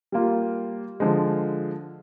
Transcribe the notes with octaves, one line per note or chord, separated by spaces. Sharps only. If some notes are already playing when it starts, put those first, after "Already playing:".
G3 A#3 F4
D3 F3 G#3